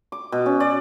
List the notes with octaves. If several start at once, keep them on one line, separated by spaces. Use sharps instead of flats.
D6
B2
C#4
D5